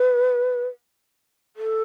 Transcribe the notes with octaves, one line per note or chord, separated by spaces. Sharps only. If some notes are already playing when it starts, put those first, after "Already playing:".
Already playing: B4
A4